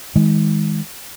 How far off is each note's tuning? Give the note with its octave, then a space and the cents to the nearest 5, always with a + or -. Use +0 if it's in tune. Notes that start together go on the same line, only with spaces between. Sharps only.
D#3 +40 G#3 +0